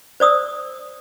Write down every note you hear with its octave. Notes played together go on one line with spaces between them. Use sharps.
C5 D5 D#6 E6